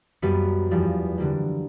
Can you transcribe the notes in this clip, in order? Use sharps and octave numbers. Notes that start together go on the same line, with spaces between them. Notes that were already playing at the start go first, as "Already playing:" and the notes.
F#2 G3 A#3 B3 B4 C#7
E2 F3 G3
D3 G3 A#3